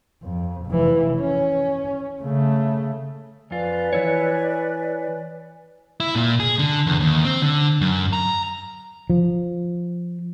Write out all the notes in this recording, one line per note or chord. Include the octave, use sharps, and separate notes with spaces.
F2
F1 E3
C#4
C#3 A3
F2 F4 B4 D5 G#5
E3 E4 C#5
E4
A#2
G#4
D3
E2
D#2
C4
D3
F#2
A#5
F3